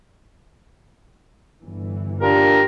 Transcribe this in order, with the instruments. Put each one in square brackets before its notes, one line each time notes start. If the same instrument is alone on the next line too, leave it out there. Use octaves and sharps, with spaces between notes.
[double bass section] G1 E3
[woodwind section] A#2 D4 A#4 [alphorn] G4